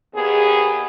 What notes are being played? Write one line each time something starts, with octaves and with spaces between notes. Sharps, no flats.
D#2 B3 G#4